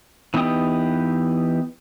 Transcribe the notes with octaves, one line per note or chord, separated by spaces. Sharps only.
E3 B3 D#4 G4 D#6